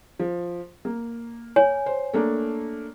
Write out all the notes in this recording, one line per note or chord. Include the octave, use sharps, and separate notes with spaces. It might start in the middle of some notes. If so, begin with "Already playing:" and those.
F3
A#3
C#5 G#5
C5
A3 A#3 D4